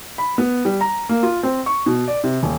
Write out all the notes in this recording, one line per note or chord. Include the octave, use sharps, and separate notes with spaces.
B5
B3
G3
A#5
A#3
F4
C4
C#6
B2
D5
C3
D#1